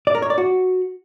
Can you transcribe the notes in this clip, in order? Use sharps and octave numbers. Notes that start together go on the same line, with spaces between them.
D5
A#4
C#5
D5
F#4